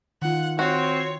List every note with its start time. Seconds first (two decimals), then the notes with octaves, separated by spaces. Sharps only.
0.22 D#3 F4 F#5
0.59 C4 F#4 C#5